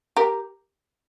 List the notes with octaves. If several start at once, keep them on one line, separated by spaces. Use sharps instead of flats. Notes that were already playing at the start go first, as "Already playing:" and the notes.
G4 A#4